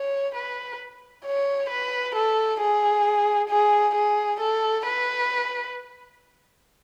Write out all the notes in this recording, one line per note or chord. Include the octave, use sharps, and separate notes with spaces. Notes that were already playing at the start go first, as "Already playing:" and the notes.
Already playing: C#5
B4
C#5
B4
A4
G#4
G#4
G#4
A4
B4